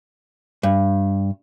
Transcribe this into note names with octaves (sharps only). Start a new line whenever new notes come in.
G2